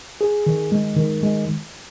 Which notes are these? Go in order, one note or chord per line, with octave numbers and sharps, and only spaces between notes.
G#4
D#3
G#3
D#3
G#3